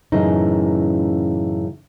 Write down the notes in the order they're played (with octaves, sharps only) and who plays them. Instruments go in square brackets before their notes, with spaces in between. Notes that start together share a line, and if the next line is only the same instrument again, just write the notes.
[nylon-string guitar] F#2 A2 C#3 E3 D#4